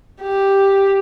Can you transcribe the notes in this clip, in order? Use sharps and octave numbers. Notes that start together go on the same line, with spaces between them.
G4